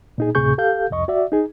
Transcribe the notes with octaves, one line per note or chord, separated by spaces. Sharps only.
A#2 D#4 G#4
D2 A2 C3 G#4 C#6 G6
G4 A4 F5 G6
C2 F2 D#5 C#6
F#4 D5 E5
D#4 G#4